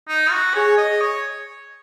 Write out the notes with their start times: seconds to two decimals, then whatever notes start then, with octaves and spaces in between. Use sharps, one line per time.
0.08 D#4
0.31 F#4
0.54 G#4 C#5
0.78 D#5
1.01 C#5